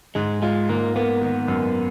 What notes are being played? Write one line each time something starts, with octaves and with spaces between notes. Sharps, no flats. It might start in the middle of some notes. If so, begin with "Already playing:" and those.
G#2 G#3
G#3 F4
G#2 A#3
A#3 B3
D#3
F#2